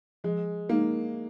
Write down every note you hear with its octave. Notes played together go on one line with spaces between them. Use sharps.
F3 G#3
G#3 A#3 D#4 A#4